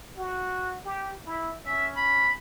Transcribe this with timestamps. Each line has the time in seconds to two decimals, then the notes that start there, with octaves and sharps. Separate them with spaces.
0.17 F#4
0.85 G4
1.26 E4
1.66 C#4 E5
1.96 B5